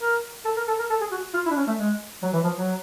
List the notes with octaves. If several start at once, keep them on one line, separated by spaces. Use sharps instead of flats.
A#4
A4
A#4
A4
A#4
A4
G#4
F#4
F4
E4
D4
C#4
A3
G#3
F#3
E3
F3
F#3